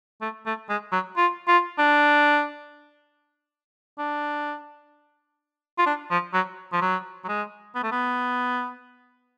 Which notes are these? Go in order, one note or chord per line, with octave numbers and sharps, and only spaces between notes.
A3
A3
G#3
F#3
F4
F4
D4
D4
F4
D4
F3
F#3
F3
F#3
F#3
G#3
B3
A3
B3